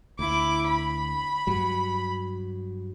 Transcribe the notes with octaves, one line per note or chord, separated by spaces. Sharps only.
D2 E4 D6
B5
G2 F#3